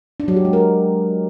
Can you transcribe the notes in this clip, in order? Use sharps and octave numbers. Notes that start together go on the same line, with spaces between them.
D4
F#3
G4
G#3
A#4